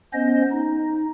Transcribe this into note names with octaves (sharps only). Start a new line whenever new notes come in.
B3 C#4 C5 D#5
D#4